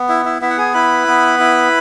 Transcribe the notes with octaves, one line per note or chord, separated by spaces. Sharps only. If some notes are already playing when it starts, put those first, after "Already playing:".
Already playing: B3
E4 E5
E4 E5
B3 E4 E5
F#5
G#4 G#5
E4 B4 B5
B3
E4